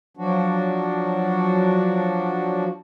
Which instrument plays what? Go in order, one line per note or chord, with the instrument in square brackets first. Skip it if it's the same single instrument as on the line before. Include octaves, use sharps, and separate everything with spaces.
[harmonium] F3 F#3 D4 F#4